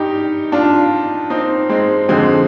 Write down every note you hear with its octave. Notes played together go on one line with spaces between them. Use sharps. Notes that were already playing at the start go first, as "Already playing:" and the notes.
Already playing: G2 D#4 G4
D4 F4
C4 D#4
G#3 C4
F2 D3 F3 G#3 C4